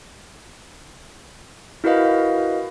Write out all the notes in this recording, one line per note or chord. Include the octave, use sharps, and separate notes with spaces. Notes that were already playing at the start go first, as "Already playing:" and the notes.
E4 F#4 A#4 B4 D#5 F5